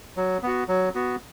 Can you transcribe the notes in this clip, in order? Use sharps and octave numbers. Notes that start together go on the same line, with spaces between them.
F#3
B3 F#4
F#3
B3 F#4